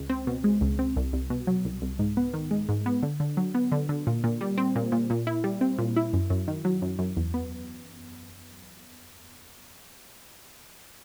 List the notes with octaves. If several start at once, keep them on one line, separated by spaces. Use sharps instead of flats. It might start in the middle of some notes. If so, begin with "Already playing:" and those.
Already playing: C#2
C4
B2
G#3
C#2
C4
C2
C2
B2
F#3
C2
C2
G#2
B3
D#3
G#3
G#2
B3
D3
D3
F#3
B3
D3
D3
A#2
A#2
G3
C4
A#2
A#2
A#2
E4
G3
C4
A#2
E4
F#2
F#2
D#3
F#3
F#2
F#2
E2
B3